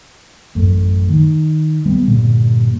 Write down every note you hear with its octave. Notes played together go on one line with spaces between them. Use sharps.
A1 F#2 A3
D#3
G3 B3
G2 A#2 D3